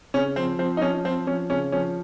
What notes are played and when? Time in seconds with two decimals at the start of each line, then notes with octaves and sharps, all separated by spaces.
0.14 C#3 C#4
0.36 F3 C4
0.59 F3 C4
0.77 D#4
0.81 F3 C#4
1.05 F3 C4
1.27 F3 C#4
1.50 C#3 C#4
1.72 F3 C#4